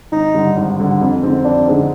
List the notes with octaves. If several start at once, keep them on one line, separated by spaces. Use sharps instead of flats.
G#1 D#4
G2 D3
G#1
G2 D3
F2
D3 G#3 C4 D#4
F2 D4
D3 G#3 C4 D#4